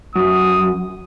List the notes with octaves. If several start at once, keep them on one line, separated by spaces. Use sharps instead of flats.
F#2 D#6